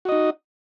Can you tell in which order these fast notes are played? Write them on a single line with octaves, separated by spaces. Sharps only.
F#4 D#5 D#4